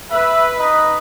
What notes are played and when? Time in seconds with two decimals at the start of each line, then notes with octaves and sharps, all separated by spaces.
0.11 B4 E5
0.58 D#4 D#5